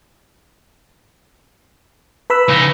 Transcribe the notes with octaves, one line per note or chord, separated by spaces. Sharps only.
B4 B5 E6
C#3 D#4